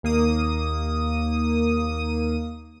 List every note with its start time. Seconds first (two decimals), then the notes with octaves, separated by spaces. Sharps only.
0.03 D#2 A#3 D#6